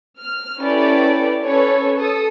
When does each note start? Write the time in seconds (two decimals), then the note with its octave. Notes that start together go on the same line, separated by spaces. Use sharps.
0.18 F6
0.60 C#4 E4 G4 A4 B4 D5
1.44 C#4 A4 B4 C#5
1.97 A4 D#6